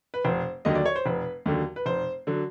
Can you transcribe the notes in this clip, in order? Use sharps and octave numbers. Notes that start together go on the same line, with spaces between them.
B4
F1 C5
D#2 D3 F#3 D#5
D5
C#5
C5
F1 B4
D#2 D3 F#3
B4
F1 C5
D3 F#3